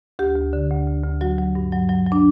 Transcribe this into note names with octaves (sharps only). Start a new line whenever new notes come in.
D2 G4
D2
D3
D2
D2
D2
F#3 F#4
F#3
G2
F#3
F#3
F#3
D4